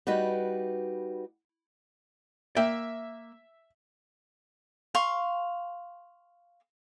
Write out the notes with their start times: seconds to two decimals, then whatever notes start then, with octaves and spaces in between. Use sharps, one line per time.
0.07 G3 D#4 F#4 B4
2.56 A#3 E5 G5
4.95 F5 C6 C#6